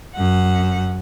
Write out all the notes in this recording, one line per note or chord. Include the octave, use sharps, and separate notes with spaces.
F#2 F#5